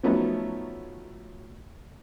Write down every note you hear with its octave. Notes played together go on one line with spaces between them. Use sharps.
F3 F#3 A3 B3 C#4 D#4